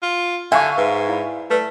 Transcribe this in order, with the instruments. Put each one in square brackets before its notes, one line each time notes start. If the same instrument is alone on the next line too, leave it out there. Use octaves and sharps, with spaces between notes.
[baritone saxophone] F4
[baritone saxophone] D3 [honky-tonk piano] E5 F5 C#6 [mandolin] G#5 [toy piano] C6
[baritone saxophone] G#2 [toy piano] B4
[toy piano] E4 D5 B5
[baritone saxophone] A3 [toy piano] B4 D5 E5